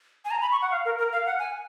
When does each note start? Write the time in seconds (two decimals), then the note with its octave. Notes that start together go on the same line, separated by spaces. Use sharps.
0.25 G#5
0.31 A#5
0.41 B5
0.52 C#6
0.62 F#5
0.71 F5
0.85 A#4
0.98 A#4
1.13 F5
1.26 F#5
1.39 G#5